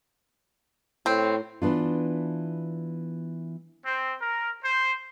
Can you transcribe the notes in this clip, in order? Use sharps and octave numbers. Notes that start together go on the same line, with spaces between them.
A2 C4
E3 B3 D4 F4
C4
A#4
C5